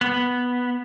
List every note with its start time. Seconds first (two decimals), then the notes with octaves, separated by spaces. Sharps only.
0.01 B3